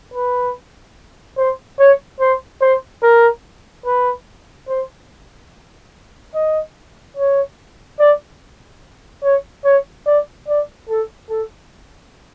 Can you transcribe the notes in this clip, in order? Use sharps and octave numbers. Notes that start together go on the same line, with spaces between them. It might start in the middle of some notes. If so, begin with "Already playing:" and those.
B4
C5
C#5
C5
C5
A#4
B4
C5
D#5
C#5
D5
C#5
C#5
D5
D5
A4
A4